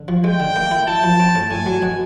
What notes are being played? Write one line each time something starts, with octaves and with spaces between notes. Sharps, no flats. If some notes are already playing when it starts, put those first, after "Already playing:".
Already playing: D3
F3
G#3 G5
D3
A#3
E4
E4 A5
F3
C4
A2
A2 G#5
F#3
B2